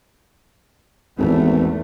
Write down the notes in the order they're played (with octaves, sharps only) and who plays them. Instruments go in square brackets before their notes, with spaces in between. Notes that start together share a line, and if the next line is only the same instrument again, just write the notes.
[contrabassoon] G#1 [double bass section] E2 A3